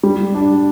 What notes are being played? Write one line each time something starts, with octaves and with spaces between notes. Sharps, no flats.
G3
D4